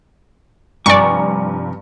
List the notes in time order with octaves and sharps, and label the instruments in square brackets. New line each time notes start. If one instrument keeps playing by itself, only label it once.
[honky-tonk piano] G2 A#5 C#7 [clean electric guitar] C3 F3 G#5 [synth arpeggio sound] D5 C#6